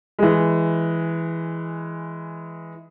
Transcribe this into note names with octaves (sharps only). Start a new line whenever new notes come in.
E3 G#3